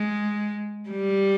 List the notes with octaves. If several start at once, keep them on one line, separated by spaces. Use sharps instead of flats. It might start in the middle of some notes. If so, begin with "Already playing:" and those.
Already playing: G#3
G3